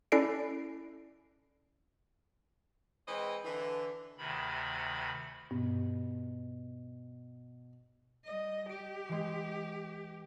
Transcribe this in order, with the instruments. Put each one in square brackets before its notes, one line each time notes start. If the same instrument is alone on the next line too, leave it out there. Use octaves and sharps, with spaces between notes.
[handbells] C#4 E4 A4 D5 C7 D7
[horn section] E3 G#3 C4 B4 C5 D#5
D3 E3
[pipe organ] D2 C3 D#3 B5
[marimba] G2 [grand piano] B2
[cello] G3 D#5
[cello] G4 [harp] D7
[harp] E3 G#3